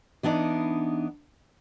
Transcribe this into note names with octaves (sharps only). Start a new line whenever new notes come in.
E3 B3 D4 D#4